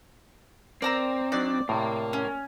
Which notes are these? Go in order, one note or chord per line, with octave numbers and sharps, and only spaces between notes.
C4 A#4 D5 A#5 E6
F#3 D4 D#4 D5
A2 C3 A#3 A#4
C#4